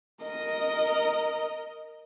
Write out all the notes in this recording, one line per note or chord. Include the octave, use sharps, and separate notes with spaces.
A#4 D#5